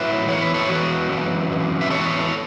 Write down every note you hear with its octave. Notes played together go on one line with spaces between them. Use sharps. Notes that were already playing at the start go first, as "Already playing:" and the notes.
Already playing: A2 F#3 B4 E5
E2 E3 C#5
B4
A4 C#5
E2 E3 F#4 B4
F#2 E3
F#2 E3
E5
C#3 E3 A4 C#5
E2